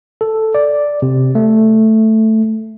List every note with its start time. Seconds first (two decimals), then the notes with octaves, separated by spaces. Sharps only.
0.21 A4
0.55 D5
1.02 C3
1.35 A3